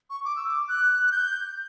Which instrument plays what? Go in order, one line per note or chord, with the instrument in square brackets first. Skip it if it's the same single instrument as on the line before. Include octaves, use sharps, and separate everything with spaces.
[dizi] C#6
D6
E6
D6
F#6
F#6
G6